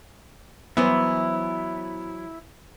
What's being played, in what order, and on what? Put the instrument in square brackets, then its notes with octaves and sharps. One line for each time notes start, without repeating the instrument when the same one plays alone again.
[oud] E3 F#3 C5 [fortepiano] B3 [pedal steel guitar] E4